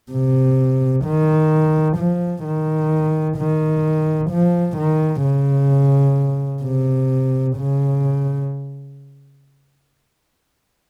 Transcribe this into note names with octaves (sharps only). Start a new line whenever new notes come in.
C3
D#3
F3
D#3
D#3
F3
D#3
C#3
C3
C#3